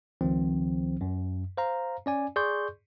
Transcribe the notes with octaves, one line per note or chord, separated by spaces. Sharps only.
C#2 D#3 F3 C4
F#2
C5 F5 A#5
C#4 D5 G#5
G#4 D5 C6 C#6 G6